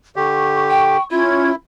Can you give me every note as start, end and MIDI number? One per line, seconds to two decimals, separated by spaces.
0.16 0.97 50
0.16 0.97 67
0.16 1.09 85
0.70 1.00 79
1.11 1.51 61
1.11 1.55 64
1.11 1.50 65
1.11 1.51 92